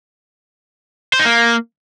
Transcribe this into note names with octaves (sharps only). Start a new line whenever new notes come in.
C5
D#4
A#3